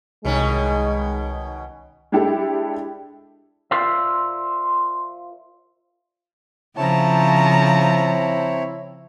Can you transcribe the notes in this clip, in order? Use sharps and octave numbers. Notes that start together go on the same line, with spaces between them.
C2 B2 D#3 G#3 C#4
G#3 D4 E4 G4 A4
F4 A#4 C5 D5 E5
C#3 F3 C4 E4 C#5 A5 A#5